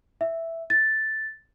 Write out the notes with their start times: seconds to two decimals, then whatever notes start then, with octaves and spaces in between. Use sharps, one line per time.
0.21 E5
0.70 A6